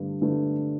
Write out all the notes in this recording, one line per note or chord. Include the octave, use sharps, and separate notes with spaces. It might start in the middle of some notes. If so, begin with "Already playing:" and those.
Already playing: G2 D3 A3 D4 B4
D3 A3 D4 B4